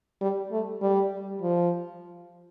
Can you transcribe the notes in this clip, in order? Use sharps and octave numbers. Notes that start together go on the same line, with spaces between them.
G3
A3
G3
F3